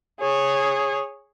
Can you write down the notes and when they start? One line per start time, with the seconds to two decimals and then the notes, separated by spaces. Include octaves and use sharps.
0.20 G#4 C#5